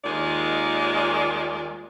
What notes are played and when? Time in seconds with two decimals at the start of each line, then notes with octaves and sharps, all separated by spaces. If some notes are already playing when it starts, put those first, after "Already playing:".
0.05 D#2 D#3 G#3 F4 D5